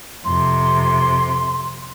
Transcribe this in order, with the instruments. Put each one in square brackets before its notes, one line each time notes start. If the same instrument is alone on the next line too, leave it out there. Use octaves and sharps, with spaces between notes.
[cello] F2 C3 [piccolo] C6